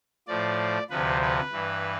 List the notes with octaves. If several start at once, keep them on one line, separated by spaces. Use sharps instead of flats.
A2 F3 D5
D2 C3 F3 B4
B4
G2 E3